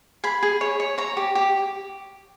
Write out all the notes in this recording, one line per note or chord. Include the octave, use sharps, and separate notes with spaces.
G#4 B5
G#4
C#5
C#5
C#5 A#5
G4
G4